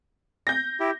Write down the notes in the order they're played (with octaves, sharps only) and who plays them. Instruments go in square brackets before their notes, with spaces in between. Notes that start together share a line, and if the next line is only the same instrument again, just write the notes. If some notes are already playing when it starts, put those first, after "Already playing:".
[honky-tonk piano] G6 A#6
[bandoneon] E4 G4